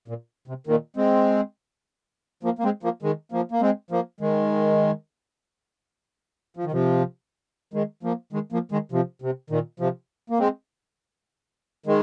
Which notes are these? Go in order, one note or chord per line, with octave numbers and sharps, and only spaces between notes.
A#2
C3
A#2 D#3
G#3 C4
F3 A#3
A#3
G#3 C4
F3 A#3
D#3 G#3
F3 A#3
A#3
G#3 C4
F3 A#3
D#3 G#3
F3
D#3
C3 F3
D#3 G#3
F3 A#3
D#3 G#3
F3 A#3
D#3 G#3
C3 F3
C3
A#2 D#3
C3 F3
A#3
G#3 C4
D#3 G#3